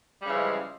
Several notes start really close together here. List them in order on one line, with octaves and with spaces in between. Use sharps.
G3 C#3 E3 F3 G#3